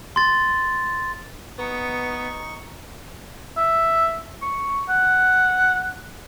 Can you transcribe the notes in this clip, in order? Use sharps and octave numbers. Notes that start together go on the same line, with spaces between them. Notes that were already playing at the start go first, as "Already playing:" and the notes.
C6 A6
B3 D#4 C#6
E5
C#6
F#5